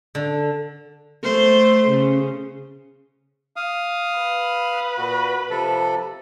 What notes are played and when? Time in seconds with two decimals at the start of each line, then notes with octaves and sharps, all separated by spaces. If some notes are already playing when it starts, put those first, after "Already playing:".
0.15 D3
1.23 A3 C5
1.89 C#3
3.56 F5 D#6
4.20 B4
4.98 A#2 F#4
5.50 C3 F3 A4